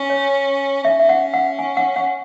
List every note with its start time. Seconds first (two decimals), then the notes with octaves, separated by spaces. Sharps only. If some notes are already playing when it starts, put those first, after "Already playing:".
Already playing: C#4
0.10 C#5
0.84 C#4 E5
0.99 E5
1.09 F#5
1.34 F#5
1.59 G#5
1.77 F#5
1.96 F#5